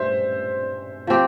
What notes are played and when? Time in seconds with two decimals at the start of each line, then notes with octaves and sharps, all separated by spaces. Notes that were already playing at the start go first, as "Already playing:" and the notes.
Already playing: G2 C5 E5
1.07 F3 C4 G4